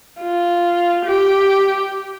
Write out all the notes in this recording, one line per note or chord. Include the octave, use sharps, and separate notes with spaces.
F4
G4